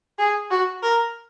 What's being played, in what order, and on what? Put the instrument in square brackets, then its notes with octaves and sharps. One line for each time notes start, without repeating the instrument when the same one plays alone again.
[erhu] G#4
F#4
A#4